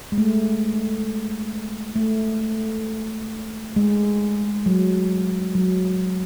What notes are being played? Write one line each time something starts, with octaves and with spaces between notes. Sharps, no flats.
G#3
A3
A3
G#3
F#3
F#3